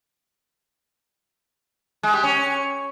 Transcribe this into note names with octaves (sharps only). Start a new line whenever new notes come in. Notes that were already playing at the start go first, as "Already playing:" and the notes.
G#3
G4
C#4